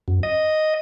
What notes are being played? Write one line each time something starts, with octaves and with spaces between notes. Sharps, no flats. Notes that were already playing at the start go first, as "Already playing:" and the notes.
F#2
D#5